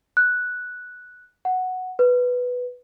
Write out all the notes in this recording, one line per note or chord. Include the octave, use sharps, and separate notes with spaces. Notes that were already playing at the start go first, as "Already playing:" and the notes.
F#6
F#5
B4